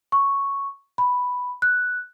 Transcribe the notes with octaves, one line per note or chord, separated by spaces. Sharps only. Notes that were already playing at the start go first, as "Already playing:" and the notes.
C#6
B5
F#6